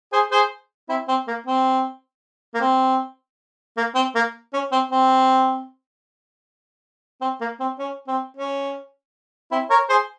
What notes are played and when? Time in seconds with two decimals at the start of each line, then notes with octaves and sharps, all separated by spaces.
0.12 G#4 C5
0.31 G#4 C5
0.89 C4 E4
1.08 C4
1.28 A#3
1.46 C4
2.54 A#3
2.61 C4
3.77 A#3
3.95 C4
4.15 A#3
4.53 C#4
4.72 C4
4.91 C4
7.21 C4
7.41 A#3
7.60 C4
7.79 C#4
8.08 C4
8.37 C#4
9.52 C4 E4
9.70 A#4 C#5
9.89 G#4 C5